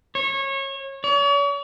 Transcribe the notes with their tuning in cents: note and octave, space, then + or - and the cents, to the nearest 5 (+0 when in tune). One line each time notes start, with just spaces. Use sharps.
C#5 -25
C#5 +40